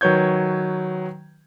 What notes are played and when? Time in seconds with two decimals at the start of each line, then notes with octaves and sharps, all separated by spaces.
0.01 D#3 F#3 B4 C#5 G6 G#6